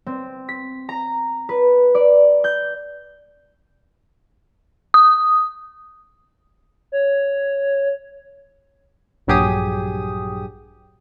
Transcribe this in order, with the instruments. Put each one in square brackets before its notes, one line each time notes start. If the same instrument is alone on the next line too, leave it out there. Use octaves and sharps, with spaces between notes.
[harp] C4
B6
A#5
B4
D5
G6
[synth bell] D#6
[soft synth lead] C#5
[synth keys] A#1 G2 F#3 G4 G#4 D#6